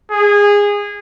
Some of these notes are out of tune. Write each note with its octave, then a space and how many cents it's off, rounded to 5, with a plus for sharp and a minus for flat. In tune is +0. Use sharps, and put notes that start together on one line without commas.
G#4 -20